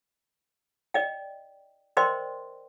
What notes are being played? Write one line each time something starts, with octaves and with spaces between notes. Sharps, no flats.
D5 D#5 G5
A#4 C5 D5 D#5 G5 C6